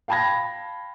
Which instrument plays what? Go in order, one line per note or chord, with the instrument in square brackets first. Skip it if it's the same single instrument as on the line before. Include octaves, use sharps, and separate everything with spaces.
[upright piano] F5 G5 A5 B5 G#6 A#6